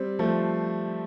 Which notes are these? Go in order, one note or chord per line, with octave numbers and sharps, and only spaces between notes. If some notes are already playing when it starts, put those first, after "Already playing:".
Already playing: G3 C4
F3 A3